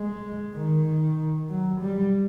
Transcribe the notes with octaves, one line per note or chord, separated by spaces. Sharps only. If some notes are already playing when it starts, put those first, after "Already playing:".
Already playing: G#3
D#3
F#3
G3